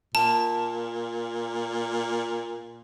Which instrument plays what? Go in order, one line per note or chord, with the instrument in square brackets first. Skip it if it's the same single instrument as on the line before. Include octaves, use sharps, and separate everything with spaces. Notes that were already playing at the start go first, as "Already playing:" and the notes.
[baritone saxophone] A#2 [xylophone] A5